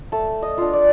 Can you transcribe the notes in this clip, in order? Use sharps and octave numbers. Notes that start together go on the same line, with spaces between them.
A3 A5
D#5
D4 F4
D5